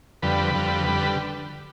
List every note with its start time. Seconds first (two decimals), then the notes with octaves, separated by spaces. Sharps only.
0.22 F2 D3 G3 B4
0.54 F2 D3 G3
0.86 D3 G3